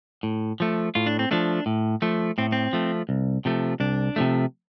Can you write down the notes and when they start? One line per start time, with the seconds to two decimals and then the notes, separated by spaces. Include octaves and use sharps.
0.23 A2
0.60 F3 A3
0.95 A2 F4
1.07 D4
1.19 C4
1.31 F3 A3 D4
1.66 A2
2.02 F3 A3
2.38 A2 C4
2.52 C4
2.73 F3 A3
3.09 C2
3.45 C3 F3 A3
3.80 C2 D4
4.16 C3 F3 A3